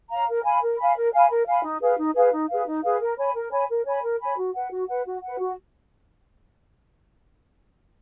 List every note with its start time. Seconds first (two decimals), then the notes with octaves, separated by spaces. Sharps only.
0.10 C#5 F5 A#5
0.28 A#4
0.44 F5 G#5 B5
0.62 A#4
0.78 F5 G#5 B5
0.96 A#4
1.13 F5 G#5 B5
1.30 A#4
1.46 F5 G#5 B5
1.64 D#4
1.81 G#4 B4 F5
1.97 D#4
2.15 G#4 B4 F5
2.32 D#4
2.49 G#4 B4 F5
2.66 D#4
2.83 G#4 B4 F5
3.00 A#4
3.17 C#5 G#5 B5
3.35 A#4
3.51 C#5 G#5 B5
3.69 A#4
3.85 C#5 G#5 B5
4.03 A#4
4.20 C#5 G#5 B5
4.37 F#4
4.54 B4 F#5
4.70 F#4
4.88 B4 F#5
5.05 F#4
5.23 B4 F#5
5.38 F#4